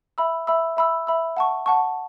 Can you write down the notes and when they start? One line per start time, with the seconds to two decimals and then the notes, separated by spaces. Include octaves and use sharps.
0.18 E5 B5 E6
0.47 E5 B5 E6
0.77 E5 B5 E6
1.07 E5 B5 E6
1.37 F#5 A5 C#6
1.66 F#5 A5 C#6